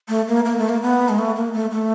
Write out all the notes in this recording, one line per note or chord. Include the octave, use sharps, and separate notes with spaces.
A3
A#3
A#3
A3
A#3
B3
G#3
A3
A#3
A3
A3